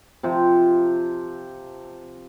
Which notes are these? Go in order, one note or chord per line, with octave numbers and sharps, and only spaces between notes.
C3 F3